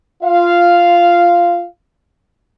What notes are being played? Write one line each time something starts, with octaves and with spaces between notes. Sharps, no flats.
F4 F5